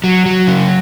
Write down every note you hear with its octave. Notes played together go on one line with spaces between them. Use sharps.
F#3
F#3
C#3